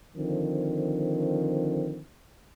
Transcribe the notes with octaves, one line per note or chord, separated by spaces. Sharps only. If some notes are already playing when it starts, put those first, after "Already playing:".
D3 D#3 F3 C4